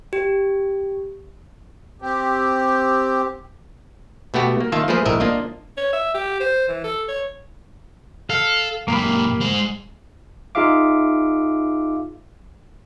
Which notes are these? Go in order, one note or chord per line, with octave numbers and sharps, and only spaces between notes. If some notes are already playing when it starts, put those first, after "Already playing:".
G4
C4 G4
B2 A3 B3 F#4 G4
A#3
D#3 A#3 F4 E5 A5
F3 A3 A#3 G#4 B4 C5
A#1 A2 A#4 D#5 E5
A#3 D4 F4 D#5
C#5
E5
G4
C5
E3
A4
C#5
A4 F5
F#2 A#2 A#3 G4 B5
G#3 C5
D#4 F4 G#4 E5 F5 D6